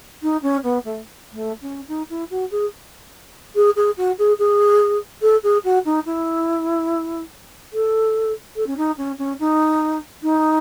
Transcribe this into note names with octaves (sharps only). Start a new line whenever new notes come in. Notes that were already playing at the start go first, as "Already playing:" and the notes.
D#4
C#4
B3
A3
A3
C#4
D#4
E4
F#4
G#4
G#4
G#4
F#4
G#4
G#4
A4
G#4
F#4
D#4
E4
A4
A4
C#4
D#4
C#4
C#4
D#4
D#4